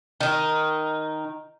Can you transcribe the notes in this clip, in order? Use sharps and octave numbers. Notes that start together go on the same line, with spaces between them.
D#3 D#4